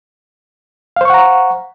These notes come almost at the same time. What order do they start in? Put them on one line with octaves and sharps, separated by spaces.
F5 C5 C#6 F#5 A#5